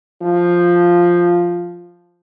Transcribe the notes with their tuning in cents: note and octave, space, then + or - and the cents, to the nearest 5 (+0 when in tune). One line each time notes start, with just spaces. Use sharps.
F3 +0